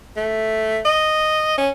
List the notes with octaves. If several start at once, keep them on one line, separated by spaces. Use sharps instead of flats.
A3
D#5
C#4